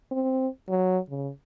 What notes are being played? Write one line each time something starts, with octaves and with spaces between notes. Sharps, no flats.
C4
F#3
C#3